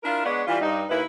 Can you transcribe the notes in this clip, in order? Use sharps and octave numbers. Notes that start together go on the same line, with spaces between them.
D4 E4 F4 A#4
G#3 B3 D4 C#5 D5 F#5
E3 G3 F4
G2 D#4
D#2 E4 B4